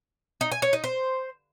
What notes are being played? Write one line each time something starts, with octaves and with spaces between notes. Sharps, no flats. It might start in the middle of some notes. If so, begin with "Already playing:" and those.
D#4
G#5
C#5
D#4
C5